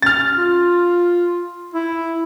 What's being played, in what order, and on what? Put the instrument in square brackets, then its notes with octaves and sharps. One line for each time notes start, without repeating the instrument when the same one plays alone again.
[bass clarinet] C#4 [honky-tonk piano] F6 A6
[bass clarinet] F4
E4